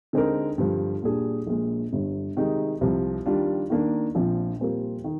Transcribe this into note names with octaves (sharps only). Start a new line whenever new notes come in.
D3 G#3 C4 D#4 A#4
G2 D3 F3
A#2 G3 D4 G#4
A#1 A#2 G#3
G1 G2 D3
C3 D#3 G#3 D#4
C2 C3 F3
D#3 G3 D4 F4
D#3 A#3 D4
A#1 A#2 F3 C4 F4
A#2 G3 C4 F4 A#4
D#3